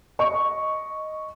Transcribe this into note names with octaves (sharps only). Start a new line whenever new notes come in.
D#5 C#6